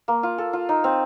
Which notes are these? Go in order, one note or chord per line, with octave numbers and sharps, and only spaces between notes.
A#3
F4
A4
F4
D#4
C4